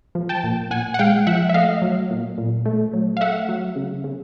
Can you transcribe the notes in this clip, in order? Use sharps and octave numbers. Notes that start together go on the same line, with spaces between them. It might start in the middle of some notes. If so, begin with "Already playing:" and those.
F3
G5 A5
A#2
A#2 F#5 G#5
F#5
G#3 F5 G5
F3 E5 F#5
E5
A3 D#5 F5
F#3
A#2
A#2
A3
F#3
F5
A3 E5 F#5
F#3
C#3
C#3